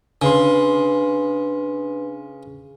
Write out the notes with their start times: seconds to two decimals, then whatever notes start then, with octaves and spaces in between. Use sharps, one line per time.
0.22 C#3 D4 B4 C6